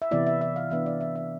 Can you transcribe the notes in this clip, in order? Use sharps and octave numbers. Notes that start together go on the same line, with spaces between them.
E5
C3 E3 B3 E4 D5
E5
E5
F5
E3 B3 D4 E5
D5
E5
E5